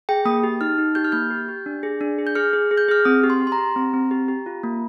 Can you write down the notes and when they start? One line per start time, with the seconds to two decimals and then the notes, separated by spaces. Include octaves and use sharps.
0.09 G#4 G5
0.25 A#3 D#6
0.43 G4
0.61 D#4 F6
0.78 D#4
0.95 G4 G6
1.04 F6
1.12 A#3 G6
1.31 G4
1.48 G4
1.66 D4
1.83 G#4
2.01 D4
2.19 G#4
2.27 G6
2.35 G#4 F6
2.53 G#4
2.71 G#4
2.77 G6
2.88 G#4 F6
3.05 C4 D#6
3.24 G4
3.30 C6
3.41 G4
3.47 C6
3.52 A#5
3.58 G4
3.76 C4
3.93 C4
4.11 G4
4.28 G4
4.46 F4
4.63 A#3